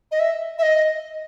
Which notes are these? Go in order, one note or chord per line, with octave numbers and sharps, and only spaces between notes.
D#5
E5
E5
D#5